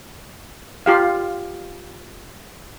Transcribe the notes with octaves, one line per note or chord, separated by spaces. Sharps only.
F4 G4 F5